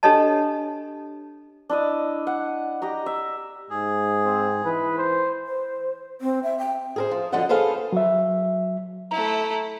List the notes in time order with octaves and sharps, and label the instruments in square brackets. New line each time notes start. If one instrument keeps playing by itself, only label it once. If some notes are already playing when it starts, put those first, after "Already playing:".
[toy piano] D4 G4 A4 C#5 D#5 A5
[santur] D4 E4 D#5
F#5
G4 D#5 A#5
E5
[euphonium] G#2 [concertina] G#4
[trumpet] C4
[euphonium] E3 [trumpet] B4
[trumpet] C5
[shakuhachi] C5
C4
E5
G5
[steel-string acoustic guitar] G#4 A#4 C5
F3
F#2 D3 F3 G3 D#5 F#5
G#4 A4 B4 C5 F5
[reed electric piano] F#3 E5
[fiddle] A3 E4 [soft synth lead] A#5